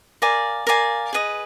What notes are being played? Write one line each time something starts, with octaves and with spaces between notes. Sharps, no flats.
A#4 D5 F5 G#5
A#4 D5 F5 G#5
G#4 B4 D#5